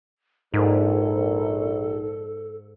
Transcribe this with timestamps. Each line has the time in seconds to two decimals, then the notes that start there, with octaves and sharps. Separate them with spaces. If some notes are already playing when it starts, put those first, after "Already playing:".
0.54 A#1 G#2 D#4 A4